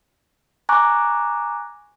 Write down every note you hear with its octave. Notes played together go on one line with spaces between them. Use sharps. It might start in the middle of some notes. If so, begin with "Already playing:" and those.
G#5 A#5 C#6 D6 F#6